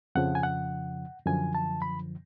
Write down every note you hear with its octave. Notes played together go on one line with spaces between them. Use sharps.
F2 C#3 F3 F#5
G#5
F#5
F#2 D3 F3 G#5
A5
B5